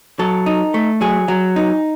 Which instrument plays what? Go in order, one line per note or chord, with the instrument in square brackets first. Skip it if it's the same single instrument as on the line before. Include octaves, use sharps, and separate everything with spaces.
[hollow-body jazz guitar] F#3 A4
D#4
A3
F#3 G#4
F#3
D#4